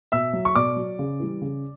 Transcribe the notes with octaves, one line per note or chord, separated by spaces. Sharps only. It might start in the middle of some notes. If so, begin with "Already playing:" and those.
B2 E5 E6
F#3
C#6
B2 D5 D6
F#3
C#3
E3 G3
C#3